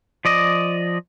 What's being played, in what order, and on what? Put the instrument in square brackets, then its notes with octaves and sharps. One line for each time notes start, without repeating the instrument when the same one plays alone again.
[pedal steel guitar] F3 D5 D#5